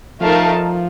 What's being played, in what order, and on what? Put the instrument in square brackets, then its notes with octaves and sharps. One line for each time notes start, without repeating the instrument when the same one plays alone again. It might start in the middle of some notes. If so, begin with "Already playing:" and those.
[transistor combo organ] F3 [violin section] A3 D#4 A#4 F5 A5